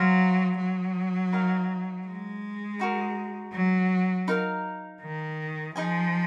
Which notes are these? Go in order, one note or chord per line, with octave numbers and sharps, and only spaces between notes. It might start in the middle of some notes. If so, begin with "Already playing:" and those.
Already playing: F#3 C5 F5 A#5
F#3
D#4 A#4 F5
G#3
D#4 F#4 A#4
F#3
D#4 A#4 F5
D#3
F3 D#4 G#4 D#5 G#5